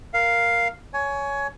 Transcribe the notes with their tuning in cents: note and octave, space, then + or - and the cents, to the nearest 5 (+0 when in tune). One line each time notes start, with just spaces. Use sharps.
A#4 +0 F5 +0
C#5 +15 G#5 +20